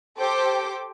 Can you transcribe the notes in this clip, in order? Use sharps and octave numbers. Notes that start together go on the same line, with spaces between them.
G4 A4 C5 G5 D6